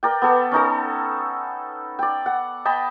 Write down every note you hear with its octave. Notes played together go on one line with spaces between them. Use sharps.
A#4 D5 G5
B3 A4
C#4 D#4 A4
D5 G5
F#5
D#5 G5 A5 B5